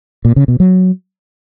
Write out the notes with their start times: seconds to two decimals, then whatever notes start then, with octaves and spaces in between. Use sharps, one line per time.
0.25 A#2
0.36 C#3
0.48 B2
0.60 F#3